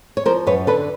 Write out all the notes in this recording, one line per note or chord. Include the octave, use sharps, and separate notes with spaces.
C#5
F3 A#4 C5
F#2 B4 C#5
D3 A4 B4